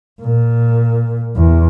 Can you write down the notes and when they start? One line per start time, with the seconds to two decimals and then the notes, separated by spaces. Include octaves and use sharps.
0.22 A#2
1.37 E2